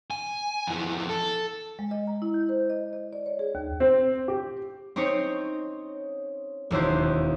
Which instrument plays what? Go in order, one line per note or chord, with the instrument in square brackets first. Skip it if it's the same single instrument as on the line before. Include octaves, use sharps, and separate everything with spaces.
[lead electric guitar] G#5
F2 E3
A4
[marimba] G#3
D#5
A#5
E4
G6
C5
D#5
D#5
D5
C#5
G#4
D#2
[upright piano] C4
G4
[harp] C4 C#4 D#4 C5 C#5
E1 D#2 E4 C5